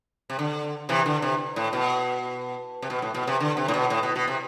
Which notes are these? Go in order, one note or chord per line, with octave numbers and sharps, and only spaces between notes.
C3
D3
C3 E3
D3
C3
A2
B2
C3
B2
A2
B2
C3
D3
C3
A2
B2
A2
B2
B2
C3